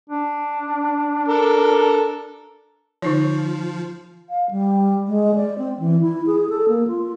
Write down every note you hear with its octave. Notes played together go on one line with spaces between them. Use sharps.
D4
A4 A#4
D3 F3 D#4 C#5
F5
G3
G#3
D5
C4
E3
E4
G#4
A4
A#3
F4